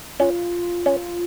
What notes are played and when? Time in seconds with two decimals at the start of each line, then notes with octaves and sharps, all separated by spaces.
0.20 C#4 F4
0.86 C#4